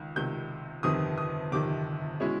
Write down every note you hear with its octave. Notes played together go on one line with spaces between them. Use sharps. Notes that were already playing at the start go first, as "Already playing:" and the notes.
Already playing: C#2 D#3
C#2 C3 D#3 G6
G1 F2 C3 D#3 D#6
D#6
G1 F2 C3 D#3 D6
B2 G#3 C#4 E4